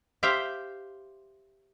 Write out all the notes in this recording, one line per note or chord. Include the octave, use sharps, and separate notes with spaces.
G4 C5 E5 F5 G5